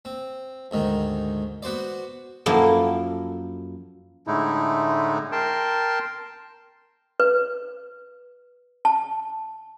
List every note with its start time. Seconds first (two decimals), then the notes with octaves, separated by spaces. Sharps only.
0.05 C4
0.71 D2 G#2 D#3
1.63 B3 F#4 C5 D5
2.46 F#2 F3 A#3 E4 A4
4.27 A2 D3 G#3 A3 D#4 E4
5.32 A#4 G5 A5 C6
7.20 B4
8.85 A5